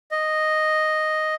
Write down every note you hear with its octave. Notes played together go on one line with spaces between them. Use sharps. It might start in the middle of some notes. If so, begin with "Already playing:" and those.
D#5